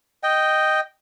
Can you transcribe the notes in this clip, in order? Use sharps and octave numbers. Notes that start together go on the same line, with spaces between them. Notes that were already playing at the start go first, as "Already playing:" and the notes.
D#5 G5